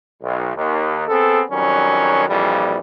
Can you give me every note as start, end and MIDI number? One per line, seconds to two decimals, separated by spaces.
0.22 0.53 35
0.55 1.06 39
1.08 1.42 59
1.08 1.42 60
1.08 1.42 68
1.08 1.42 69
1.51 2.25 41
1.51 2.25 51
1.51 2.25 54
1.51 2.25 55
1.51 2.25 61
2.28 2.78 34
2.28 2.78 41
2.28 2.78 46
2.28 2.78 52
2.28 2.78 55